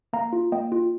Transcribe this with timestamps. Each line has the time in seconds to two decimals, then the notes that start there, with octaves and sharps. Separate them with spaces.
0.13 A#3 F5 A#5
0.33 F4
0.52 A#3 D#5 G5
0.72 F4